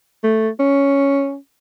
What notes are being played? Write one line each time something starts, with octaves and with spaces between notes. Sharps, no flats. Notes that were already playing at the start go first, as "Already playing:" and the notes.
A3
C#4